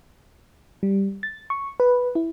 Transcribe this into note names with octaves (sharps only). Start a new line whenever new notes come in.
G3
A6
C#6
B4
E4